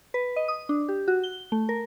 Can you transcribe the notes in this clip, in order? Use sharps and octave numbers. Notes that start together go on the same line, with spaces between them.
B4
D#5
D#6
D4
G4
F#4
G7
A3
A#4